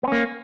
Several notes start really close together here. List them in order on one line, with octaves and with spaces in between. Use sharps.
B3 C#4 A#3